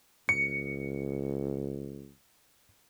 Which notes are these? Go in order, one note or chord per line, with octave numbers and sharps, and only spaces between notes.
C#2 C#7